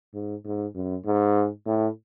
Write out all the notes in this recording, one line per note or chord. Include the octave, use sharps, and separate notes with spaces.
G#2
G#2
F#2
G#2
A2